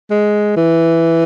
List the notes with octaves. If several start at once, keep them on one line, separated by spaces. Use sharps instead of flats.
G#3
E3